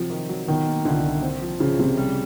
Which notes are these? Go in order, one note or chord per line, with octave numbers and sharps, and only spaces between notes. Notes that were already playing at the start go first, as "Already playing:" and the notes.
Already playing: C3 F3 F#3
D#3
F#3
B2 D#3
A#3
C2 D3
C2
C4
F3
C#3 F3
C3 F3
G3